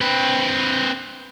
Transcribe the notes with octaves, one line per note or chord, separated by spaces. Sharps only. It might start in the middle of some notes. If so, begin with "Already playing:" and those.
C4 B4